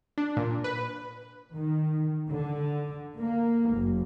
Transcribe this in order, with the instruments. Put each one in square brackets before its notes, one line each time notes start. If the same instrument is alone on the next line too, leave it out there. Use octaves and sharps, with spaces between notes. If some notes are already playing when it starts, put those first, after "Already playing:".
[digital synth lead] D4
A#2
B4
[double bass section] D#3
D3
A#3
F#1